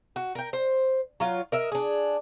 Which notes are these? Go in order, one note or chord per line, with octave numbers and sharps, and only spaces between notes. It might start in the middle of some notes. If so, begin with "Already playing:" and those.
F#4
A#4 G5
C5
F#3 F4
A#4 D#5 E5
D4 G#4